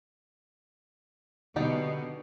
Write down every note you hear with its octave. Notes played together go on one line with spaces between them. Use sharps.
B2 D3 D#4 G4 D5